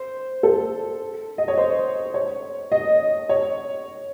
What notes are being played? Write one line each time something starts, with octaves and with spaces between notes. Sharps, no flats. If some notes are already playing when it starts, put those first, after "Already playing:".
Already playing: C5
A4
D#5
C#5
C5
C#5
D#5
C#5